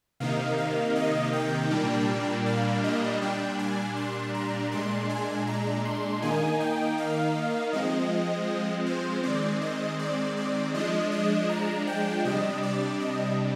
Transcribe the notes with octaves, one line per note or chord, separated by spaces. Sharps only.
C3 D#3 A#3 D#4 F5
F5
D#5
G5
A#2 G3 A#3 D4
F5
D#5
A#2 G3 D4 G5
G#5
C6
A#5
A#2 G#3 D4 C6
G#5
A#5
C6
D#3 A#3 D#4 G#5
G5
F5
F3 G#3 C4 D#5
C5
D#3 G#3 C4 D5
D#5
D5
D5
F3 G#3 D4 D#5
D#5
A#5
G5
C3 G3 D4 D#5
D5
D#5